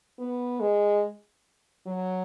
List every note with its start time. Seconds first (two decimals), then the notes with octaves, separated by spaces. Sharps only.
0.19 B3
0.61 G#3
1.87 F#3